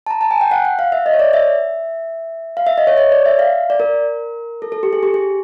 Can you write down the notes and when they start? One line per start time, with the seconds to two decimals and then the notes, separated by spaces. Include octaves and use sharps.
0.06 A5
0.11 A#5
0.21 A5
0.31 G#5
0.41 G5
0.51 F#5
0.65 F#5
0.79 F5
0.92 E5
1.06 D#5
1.13 C#5
1.19 D5
1.33 E5
2.57 F5
2.67 E5
2.78 D#5
2.87 C#5
2.98 C#5
3.12 D5
3.26 E5
3.39 F5
3.70 D5
3.80 A#4
4.62 A4
4.72 A4
4.83 G4
4.93 G#4
5.03 G4
5.14 G#4